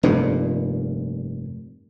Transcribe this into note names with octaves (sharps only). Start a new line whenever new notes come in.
F1 G2 A#2